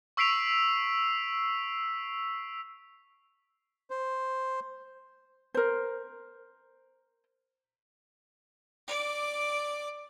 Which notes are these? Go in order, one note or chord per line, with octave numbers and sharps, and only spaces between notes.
C#6 E6 B6 C7 D7 F7
C5
A#4 C5
D5 D6